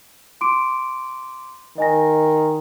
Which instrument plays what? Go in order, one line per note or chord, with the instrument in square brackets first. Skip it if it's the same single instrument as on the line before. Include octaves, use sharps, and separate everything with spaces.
[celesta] C6 D6 D7
[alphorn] D#3 [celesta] D#5 G#5 A#6